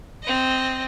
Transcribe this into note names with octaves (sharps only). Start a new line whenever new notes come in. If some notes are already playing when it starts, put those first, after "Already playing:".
C4 D#5